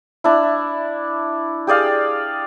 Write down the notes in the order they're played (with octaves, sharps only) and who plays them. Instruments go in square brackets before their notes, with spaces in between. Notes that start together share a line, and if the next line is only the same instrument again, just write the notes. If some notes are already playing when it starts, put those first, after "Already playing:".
[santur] D4 E4
G4 G#4 D5 F5